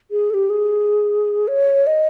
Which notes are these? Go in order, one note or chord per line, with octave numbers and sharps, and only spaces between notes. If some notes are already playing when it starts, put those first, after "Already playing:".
G#4
A4
G4
G#4
C#5
D#5